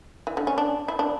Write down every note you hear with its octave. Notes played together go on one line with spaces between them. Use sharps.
E3
D3
C#4
D4
E4
D4